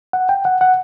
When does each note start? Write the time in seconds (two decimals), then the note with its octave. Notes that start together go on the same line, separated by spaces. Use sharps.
0.13 F#5
0.29 G5
0.45 F#5
0.61 F#5